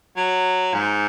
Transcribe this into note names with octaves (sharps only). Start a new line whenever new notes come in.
F#3
G#2